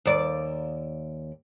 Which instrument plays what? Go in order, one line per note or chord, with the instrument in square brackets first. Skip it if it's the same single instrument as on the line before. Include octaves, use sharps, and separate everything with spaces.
[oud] D#2 D5